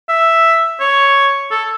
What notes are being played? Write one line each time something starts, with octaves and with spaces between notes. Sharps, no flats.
E5
C#5
A4